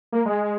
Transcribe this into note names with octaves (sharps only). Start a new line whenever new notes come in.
A#3
G#3